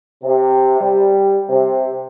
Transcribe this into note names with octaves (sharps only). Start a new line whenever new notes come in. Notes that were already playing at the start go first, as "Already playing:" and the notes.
C3
G3
C3